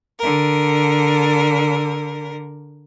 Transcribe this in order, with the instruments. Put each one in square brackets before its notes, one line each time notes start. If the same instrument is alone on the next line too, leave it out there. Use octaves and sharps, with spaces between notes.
[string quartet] D3 A#4